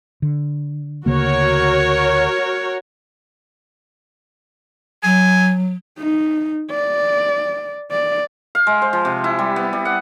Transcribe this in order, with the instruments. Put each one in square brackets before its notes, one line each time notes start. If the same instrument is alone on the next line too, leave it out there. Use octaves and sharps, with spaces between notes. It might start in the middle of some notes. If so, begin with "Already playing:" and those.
[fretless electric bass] D3
[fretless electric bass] D2 C#3 A#3 [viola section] F#4 A#4 C#5
[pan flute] F#3 [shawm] G#5
[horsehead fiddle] D#4
D5
D5
[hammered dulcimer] F5
G#3
C5
F3
C3
E4
G3
B3
G3
F#5